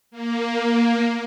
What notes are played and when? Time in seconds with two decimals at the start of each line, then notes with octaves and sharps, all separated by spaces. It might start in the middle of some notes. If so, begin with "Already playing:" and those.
0.11 A#3